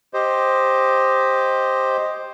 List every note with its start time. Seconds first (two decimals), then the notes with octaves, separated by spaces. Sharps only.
0.14 G4 C5 D#5